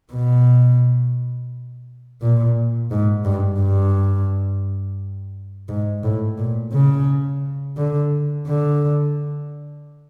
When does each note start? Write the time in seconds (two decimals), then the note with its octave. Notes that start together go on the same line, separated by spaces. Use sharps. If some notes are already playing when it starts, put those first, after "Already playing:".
0.13 B2
2.22 A#2
2.91 G#2
3.25 G2
3.59 G2
5.69 G#2
6.03 A2
6.38 A#2
6.73 C#3
7.77 D3
8.47 D3